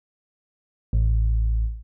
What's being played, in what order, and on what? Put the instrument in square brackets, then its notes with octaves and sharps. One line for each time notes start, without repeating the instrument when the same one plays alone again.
[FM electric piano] A1